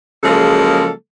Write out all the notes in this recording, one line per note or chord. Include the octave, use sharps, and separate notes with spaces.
C#3 F3 F#3 G#3 A#3 A4